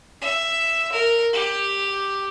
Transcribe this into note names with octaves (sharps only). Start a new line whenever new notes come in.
E5
A#4
G4